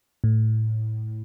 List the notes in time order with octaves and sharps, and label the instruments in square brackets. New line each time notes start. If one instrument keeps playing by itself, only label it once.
[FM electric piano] A2